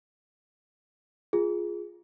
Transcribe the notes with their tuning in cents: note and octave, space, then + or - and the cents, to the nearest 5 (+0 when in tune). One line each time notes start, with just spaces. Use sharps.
F4 +0 G#4 +0